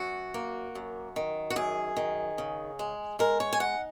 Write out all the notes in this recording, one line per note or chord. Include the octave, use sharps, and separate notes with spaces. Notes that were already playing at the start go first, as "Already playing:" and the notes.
Already playing: F#2 F#4
A#3
F#2
D#3
F#4
F#2 G#4
D#3
C#3
G#3
G#3 A#4
C#5
G#5
D#4 F#5